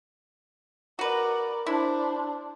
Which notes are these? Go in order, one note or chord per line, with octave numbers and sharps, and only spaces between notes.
F#4 A#4 B4 D5
D4 E4 C5